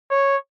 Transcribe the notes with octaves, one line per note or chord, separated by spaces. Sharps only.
C#5